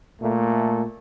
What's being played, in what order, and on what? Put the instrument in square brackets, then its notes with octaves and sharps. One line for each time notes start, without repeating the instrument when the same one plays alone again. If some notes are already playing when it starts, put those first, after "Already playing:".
[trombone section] A#2 A3